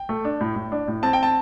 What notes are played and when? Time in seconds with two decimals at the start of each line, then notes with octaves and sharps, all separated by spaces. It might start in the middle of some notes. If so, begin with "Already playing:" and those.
Already playing: G5
0.09 A3
0.25 D4
0.41 A2
0.56 A2
0.72 D4
0.88 A2
1.03 C4 A5
1.13 G5
1.23 A5